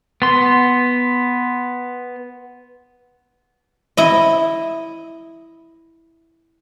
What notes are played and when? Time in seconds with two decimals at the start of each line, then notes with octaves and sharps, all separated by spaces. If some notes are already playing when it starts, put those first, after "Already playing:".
0.22 B3 C6
3.97 E4 D#5